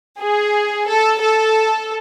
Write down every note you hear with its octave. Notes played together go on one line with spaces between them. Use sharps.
G#4
A4
A4